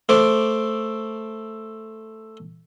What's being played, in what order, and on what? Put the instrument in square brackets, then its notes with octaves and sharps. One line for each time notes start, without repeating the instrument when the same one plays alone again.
[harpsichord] A3 C5 D6